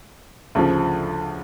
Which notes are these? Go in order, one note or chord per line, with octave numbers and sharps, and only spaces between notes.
D2 C#3 F3